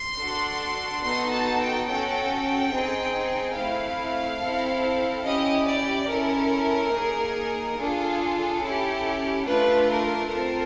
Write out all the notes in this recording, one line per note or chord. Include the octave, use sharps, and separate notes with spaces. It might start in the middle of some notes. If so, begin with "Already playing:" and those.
Already playing: C6
D4 F#4 A4
B3 D#4 F#4 A4 C6
A5
G5
C#4 F#4 A4 G5
C4 D#4 G#4
A3 C4 E4 F5
C4 E4 A4
C#4 E4 G4 D#5
D5
C#4 E4 A4 A#4
A#3 D#4 G#4
D4 F4 G#4 A4
C#4 E4 G4
A3 D4 F4 B4
A#4
C4 F4 A4 A#4